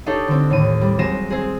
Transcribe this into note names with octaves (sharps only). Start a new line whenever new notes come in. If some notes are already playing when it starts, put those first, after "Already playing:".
D4 D#4 G4 A4 C#5
D3 C4
D#2 A2 D#7
G3
F#3 G#3 C4 A#6 D#7 E7
C4 G#4